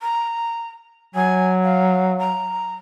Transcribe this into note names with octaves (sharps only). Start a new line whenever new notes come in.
A#5
F#3 G#5
F5
A#5